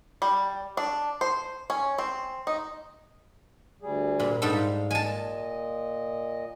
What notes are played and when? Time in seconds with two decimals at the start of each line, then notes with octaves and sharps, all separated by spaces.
0.22 G3
0.77 D4
1.21 C5
1.70 C#4
1.98 C4
2.47 D#4
3.82 D2 G3 G#4
4.20 A#2
4.42 G#2 G3 A4 F5
4.91 A#2 D#5 G#5 A5